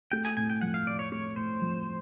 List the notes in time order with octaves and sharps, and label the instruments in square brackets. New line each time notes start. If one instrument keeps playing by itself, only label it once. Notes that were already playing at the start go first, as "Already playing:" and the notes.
[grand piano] A3 [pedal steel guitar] G5
[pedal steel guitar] G#5
[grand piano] A2 [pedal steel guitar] G#5
[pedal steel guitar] G5
[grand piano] F3 [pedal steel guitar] F#5
[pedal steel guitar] F5
[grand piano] A2 [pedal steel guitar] D5
[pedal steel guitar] C#5
[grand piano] A3 [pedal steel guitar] C#5
[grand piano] A2 [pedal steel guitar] C5
[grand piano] F3